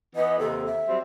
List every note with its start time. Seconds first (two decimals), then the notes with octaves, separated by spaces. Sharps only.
0.16 E3 B3 D#5
0.39 D#2 C3 A4
0.66 E5
0.88 F#3 G3 C4